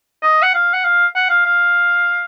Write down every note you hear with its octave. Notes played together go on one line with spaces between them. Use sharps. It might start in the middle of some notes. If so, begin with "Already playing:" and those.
D#5
F#5
F5
F#5
F5
F#5
F5
F5